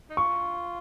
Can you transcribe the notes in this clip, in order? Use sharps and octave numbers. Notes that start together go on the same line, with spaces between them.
D#4
F4 C#6